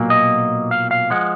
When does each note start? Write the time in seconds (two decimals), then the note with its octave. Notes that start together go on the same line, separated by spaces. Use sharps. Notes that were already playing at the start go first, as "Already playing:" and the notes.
Already playing: B1 A#2 F#3 A#3
0.10 D#5
0.71 F5
0.91 F5
1.10 F3 G#3 F#5